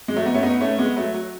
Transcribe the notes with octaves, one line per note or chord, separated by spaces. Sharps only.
G#3
F#3 A3
B3 D#4
A3 C#4
B3 D#4
A3 C#4
G#3 B3
F#3 A3
F#3